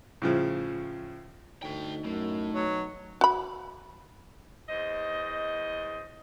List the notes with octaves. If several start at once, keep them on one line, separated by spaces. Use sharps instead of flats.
A2 C#3 F3
D2 D#4 A4 G5
F#2 A2
B1 F#3
F#4 B5
E2 C5 D#5